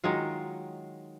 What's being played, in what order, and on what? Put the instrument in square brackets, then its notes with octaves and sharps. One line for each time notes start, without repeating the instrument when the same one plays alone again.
[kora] D#3 F#3 G#3 F4